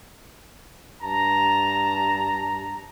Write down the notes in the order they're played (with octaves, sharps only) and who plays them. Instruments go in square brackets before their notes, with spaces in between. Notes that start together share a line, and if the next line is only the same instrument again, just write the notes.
[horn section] G2 A5 A#5